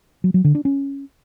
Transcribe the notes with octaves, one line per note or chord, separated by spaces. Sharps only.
F#3
F#3
D3
D4
C#4